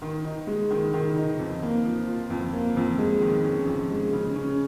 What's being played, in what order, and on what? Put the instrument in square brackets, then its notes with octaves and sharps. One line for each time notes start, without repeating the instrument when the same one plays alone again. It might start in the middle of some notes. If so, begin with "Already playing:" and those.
[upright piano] D#3
D#4
G#3
D#3
D#3
D#4
F2
A#3
F3
F4
F2
A#3
F2
G#3
D#3
C#4
F2
G#3
C#3
C#4